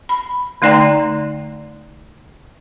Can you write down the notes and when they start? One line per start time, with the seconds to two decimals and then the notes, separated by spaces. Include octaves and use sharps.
0.09 B5
0.62 D3 A3 D#4 D5 G5 A#5